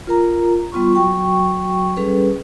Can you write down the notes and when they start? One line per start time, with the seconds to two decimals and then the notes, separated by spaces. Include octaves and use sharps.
0.07 F4 A#4 A#5
0.72 G3 B3 F4 C6 C#6
0.95 F#3 F#4 G5 C#6
1.97 G3 C#4 G#4 A4 B4